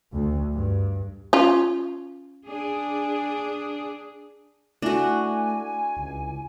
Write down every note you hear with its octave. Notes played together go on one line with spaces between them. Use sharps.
D2
G2
C#4 F4
D4 G#4
A3 D4 E4 F#4 G#5
C#2